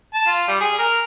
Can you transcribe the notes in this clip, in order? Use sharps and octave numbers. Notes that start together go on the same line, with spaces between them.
A5
F4
G3
G#4
A#4